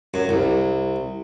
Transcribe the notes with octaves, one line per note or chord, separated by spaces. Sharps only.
F#2
C2